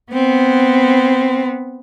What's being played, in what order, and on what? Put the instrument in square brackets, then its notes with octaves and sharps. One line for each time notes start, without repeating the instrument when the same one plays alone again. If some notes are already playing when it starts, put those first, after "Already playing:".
[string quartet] B3 C4